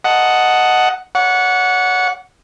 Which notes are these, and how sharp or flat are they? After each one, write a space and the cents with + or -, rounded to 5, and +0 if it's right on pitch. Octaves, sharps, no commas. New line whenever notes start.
D#5 +0 F#5 +0 A5 +0
C#5 +45 F#5 -15